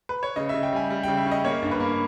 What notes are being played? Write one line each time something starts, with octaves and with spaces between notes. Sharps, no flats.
B4
C#5
C#3 D#5
E5
C#3
G5
G3 G#5
G3
G5
C#3
E5
C#4
D#5
A#3 C#5
G2
B4
A#3